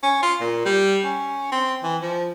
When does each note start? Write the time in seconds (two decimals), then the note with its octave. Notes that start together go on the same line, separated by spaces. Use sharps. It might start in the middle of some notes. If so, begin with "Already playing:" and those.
0.03 C#4
0.22 F4
0.41 A#2
0.65 G3
1.04 C#4
1.52 C4
1.83 E3
2.02 F3